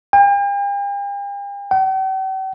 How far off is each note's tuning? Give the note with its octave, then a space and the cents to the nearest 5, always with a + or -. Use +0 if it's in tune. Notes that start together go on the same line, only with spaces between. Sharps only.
G5 +45
G5 -45